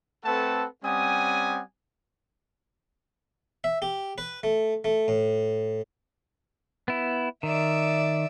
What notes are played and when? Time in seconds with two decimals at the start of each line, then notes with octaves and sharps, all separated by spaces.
0.25 A3 C4 A4 B4 F#5 A5
0.85 G3 C4 C#4 F#5 G#5 D#6
3.64 E5
3.82 G4
4.18 B4
4.43 A3
4.84 A3
5.08 A2
6.88 B3 E4
7.43 D#3 D5 E5